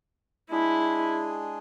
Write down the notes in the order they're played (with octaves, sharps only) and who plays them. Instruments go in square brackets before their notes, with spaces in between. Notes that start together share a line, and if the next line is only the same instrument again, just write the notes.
[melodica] G#3 D4 G#4 [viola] E4